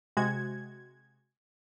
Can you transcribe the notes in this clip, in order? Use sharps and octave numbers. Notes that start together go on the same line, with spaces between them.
C3 G#3 F#4 G#6